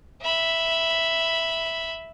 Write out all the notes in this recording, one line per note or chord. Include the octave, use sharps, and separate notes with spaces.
E5 B5